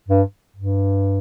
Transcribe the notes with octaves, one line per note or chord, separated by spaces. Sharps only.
G2
G2